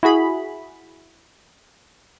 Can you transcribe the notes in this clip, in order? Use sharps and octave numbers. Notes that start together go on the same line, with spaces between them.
E4 F#4 G#4 B5